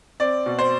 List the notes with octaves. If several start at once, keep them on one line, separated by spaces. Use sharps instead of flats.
C4 D5
B2
C5